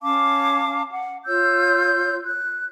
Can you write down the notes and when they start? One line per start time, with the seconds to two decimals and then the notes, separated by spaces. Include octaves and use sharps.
0.02 C#4 F5 A5 D6
0.91 F#5
1.26 F4 C#5 E6 G6
2.25 F#6